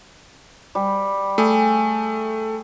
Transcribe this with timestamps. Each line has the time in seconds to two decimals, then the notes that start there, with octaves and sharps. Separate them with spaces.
0.75 G3
1.38 A3 G#4